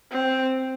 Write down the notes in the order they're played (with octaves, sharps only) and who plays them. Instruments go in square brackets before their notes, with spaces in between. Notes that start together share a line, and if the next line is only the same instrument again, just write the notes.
[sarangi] C4